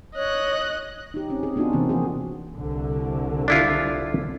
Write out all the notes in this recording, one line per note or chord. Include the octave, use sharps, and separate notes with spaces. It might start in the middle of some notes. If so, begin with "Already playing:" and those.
C#5 D#5 F#6
D#4 G4
C4 C#4
G#4
B3 D4 D#4 F4 F#4
C3 E3 A#3 C4 C#4
F3 A#3 F#4 G#4
C2 D3
D4 E4 F4